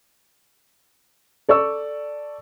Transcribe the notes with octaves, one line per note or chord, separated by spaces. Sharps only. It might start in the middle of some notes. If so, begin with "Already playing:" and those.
A4 D5 C#6 E6